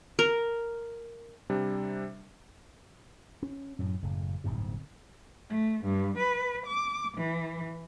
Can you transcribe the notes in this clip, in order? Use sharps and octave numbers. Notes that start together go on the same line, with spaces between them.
A#4
C3 G3 D4
C#4
F#2 A2 F#3
F#1 A2 C#3
D1 G1 G#2 C3
A3
G2
B4
D6
E3